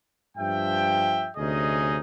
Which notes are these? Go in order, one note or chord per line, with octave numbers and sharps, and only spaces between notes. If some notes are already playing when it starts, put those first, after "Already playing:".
G2 F3 E5 G5
D2 C3 C#4 D#4 G#4 D#5